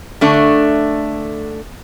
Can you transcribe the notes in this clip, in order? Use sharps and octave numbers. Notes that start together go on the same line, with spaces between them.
D3 A3 D4